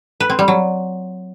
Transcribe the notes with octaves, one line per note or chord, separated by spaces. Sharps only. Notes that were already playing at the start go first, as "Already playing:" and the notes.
B4
C4
G3
F#3